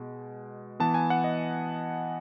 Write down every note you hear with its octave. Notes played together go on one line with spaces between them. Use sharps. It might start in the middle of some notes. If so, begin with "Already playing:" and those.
Already playing: B2 G#3
E3 B3 A5
G#5
F#5
D#5